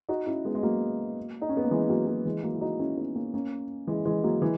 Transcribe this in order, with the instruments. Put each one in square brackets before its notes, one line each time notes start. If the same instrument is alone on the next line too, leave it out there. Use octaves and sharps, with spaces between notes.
[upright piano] D#4 F#4
C#4 E4
G#3 B3
G#3
F#3 A#3
D#4
C#4
B3
A#3
E3 G#3
F#3 A#3
F#3 A#3
E3 G#3
F#3 A#3
E4
D#4 F#4
C#4 E4
B3 D#4
A#3 C#4
A#3 C#4
E3 G#3
E3 G#3
F#3 A#3
E3 G#3